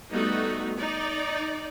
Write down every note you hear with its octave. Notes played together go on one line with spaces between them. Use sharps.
G3 A3 B3 D#4 F#4
D#4 D5